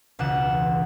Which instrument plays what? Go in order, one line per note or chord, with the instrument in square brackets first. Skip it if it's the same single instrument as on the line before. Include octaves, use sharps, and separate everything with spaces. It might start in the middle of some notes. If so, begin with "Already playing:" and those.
[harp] E1 C#2 F#5 E7